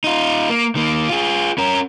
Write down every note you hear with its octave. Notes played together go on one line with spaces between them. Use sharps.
D#4 F4
A#3
D#3 A#3
F4 G#4
C#4 A#4